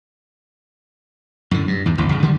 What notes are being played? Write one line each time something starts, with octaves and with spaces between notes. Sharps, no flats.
F#2 A2 D3
G2
E2 G#2
A1 D2 A2
F#2 C#3
D3 D#3 G3